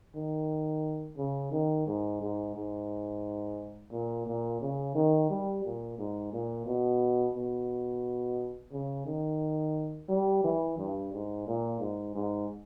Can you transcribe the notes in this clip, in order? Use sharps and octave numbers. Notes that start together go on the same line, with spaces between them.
D#3
C#3
D#3
G#2
G#2
G#2
A#2
A#2
C#3
D#3
G3
A#2
G#2
A#2
B2
B2
C#3
D#3
G3
E3
G2
G#2
A#2
G#2
G#2